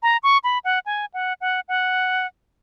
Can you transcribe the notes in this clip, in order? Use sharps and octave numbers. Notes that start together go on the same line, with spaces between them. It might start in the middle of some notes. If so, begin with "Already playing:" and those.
A#5
C#6
B5
F#5
G#5
F#5
F#5
F#5